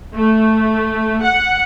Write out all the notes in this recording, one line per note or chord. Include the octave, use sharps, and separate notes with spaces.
A3
F#5